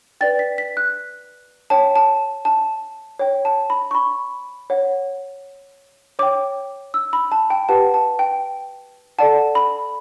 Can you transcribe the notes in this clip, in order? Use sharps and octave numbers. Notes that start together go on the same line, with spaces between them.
B4 D5 G5 A6
B6
B6
F#6
C#5 G5 A5
A5
A5
C#5 G5
A5
B5
C#6
B5
C#5 F#5
C#5 G5 D6
E6
B5
A5
G5
G4 B4 F#5 A5
A5
G5
A4 D5 F#5 A5
B5